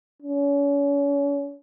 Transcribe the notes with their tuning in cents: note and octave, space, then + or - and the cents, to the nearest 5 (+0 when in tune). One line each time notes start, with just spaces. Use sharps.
C#4 +35